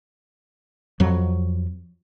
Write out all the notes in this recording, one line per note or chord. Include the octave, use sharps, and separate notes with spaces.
F2 F#3